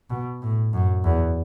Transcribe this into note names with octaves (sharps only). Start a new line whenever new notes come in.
B2
A2
F#2
E2